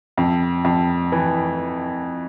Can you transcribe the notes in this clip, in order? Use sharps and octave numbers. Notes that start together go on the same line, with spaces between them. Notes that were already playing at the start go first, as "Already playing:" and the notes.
F2
F2
E3